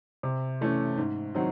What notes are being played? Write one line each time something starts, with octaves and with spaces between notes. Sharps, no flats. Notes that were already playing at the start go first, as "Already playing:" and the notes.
C3
E3 A3 C#4
G#2
D#3 F#3 C4 D#4